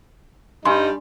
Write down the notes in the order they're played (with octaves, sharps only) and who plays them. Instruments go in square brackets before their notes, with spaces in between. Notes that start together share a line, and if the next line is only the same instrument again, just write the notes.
[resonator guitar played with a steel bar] G2 [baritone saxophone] G3 [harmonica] D#4 [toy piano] G#5 C6